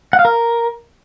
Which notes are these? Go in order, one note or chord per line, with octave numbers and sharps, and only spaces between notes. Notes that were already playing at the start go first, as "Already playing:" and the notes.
F#5
F5
A#4